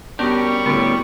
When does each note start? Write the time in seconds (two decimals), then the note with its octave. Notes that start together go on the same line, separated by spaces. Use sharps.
0.19 G3 B3 C#4 D4 F#4 G4 A#4 C#6
0.66 C2 A2 D3 B3 C#4 F#4